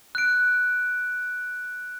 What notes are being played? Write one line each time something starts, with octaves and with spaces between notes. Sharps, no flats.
F#6 D7